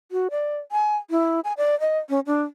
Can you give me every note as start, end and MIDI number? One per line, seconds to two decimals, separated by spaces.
0.12 0.28 66
0.31 0.58 74
0.72 0.97 80
1.11 1.40 64
1.44 1.53 80
1.57 1.78 74
1.80 1.99 75
2.09 2.20 61
2.26 2.42 62